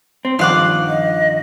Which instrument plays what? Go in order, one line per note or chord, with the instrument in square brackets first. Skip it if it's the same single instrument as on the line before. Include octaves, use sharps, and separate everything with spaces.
[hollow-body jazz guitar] C4
[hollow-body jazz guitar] G2 D#3 F3 [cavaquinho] F5 F#5 D6
[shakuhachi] D#5